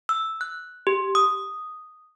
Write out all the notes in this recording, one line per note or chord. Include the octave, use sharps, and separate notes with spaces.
E6
F#6
G4
D#6